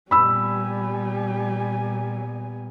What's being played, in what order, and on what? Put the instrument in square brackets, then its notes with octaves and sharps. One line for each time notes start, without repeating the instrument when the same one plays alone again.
[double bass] A#2 B3 [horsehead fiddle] G3 G#5 [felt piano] B5 E6